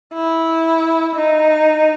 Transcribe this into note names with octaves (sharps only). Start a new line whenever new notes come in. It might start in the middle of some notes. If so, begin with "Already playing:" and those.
E4
D#4